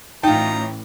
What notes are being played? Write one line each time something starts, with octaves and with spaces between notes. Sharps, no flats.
A2 E3 C#4 D#4 F4 G5 A#5